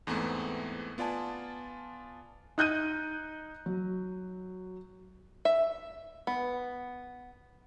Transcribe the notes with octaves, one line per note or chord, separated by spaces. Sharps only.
E2 G#2 E3 A3 B3 C4
B3 F4 D5 G#5 A5
D#4 F#6 G6 D#7
F#3
E5
B3